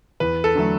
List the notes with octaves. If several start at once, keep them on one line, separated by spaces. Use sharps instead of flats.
E2 B4
A4
D3 F#3 A3